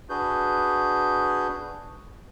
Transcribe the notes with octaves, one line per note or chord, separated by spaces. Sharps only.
D4 F#4 G#4 B4 G6